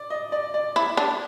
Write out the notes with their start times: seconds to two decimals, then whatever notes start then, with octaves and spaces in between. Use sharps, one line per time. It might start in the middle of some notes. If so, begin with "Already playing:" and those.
Already playing: D5
0.10 D#5
0.32 D5
0.54 D5
0.76 E4
0.97 D4